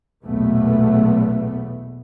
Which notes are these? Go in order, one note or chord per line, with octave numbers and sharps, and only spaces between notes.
B1 E2 A#2 A3 B3